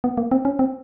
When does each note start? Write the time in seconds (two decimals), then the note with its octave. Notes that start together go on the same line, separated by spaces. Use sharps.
0.04 B3
0.17 A#3
0.31 C4
0.45 C#4
0.59 C4